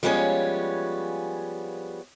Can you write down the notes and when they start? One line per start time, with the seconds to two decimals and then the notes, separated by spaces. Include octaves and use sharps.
0.03 F3 G3 G#3 B3 C#4 C#5